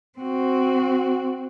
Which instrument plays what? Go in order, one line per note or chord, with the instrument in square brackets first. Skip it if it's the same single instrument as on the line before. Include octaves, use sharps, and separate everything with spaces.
[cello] C4 F#4